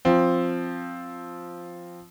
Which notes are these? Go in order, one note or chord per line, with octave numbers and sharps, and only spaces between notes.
F3 C4